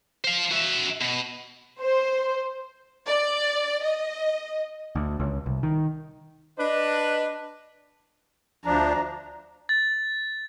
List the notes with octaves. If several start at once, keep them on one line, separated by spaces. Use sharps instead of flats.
C5 F5
F#4 E5
B2
C5
D5
D#5
D2
C#2
C2
D#3
D4 B4 D#5
D2 F3 D4 A#5
A6